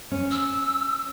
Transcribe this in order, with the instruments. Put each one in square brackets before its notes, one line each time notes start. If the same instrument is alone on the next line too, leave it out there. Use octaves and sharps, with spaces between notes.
[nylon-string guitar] C#4
[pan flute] E6